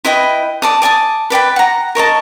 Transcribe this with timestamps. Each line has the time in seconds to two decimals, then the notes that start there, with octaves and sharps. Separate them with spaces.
0.05 E4 B4 D#5 G5
0.62 D5 A5 D#6
0.82 D5 G#5 A5 D#6
1.30 B4 D5 G5 B5
1.56 F#5 A#5
1.95 A#4 C#5 D#5 A5